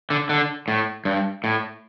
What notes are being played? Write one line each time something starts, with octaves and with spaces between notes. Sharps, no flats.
D3
D3
A2
G2
A2